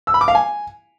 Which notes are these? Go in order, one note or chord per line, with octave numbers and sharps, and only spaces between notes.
E6
B5
D6
F5
G#5